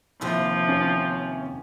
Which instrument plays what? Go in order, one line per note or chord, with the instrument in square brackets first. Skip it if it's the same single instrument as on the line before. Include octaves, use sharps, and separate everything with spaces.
[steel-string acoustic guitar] D#2 C3 E3 [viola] F3
[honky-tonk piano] C#4